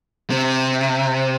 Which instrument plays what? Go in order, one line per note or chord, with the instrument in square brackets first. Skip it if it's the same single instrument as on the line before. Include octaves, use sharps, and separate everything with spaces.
[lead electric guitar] C3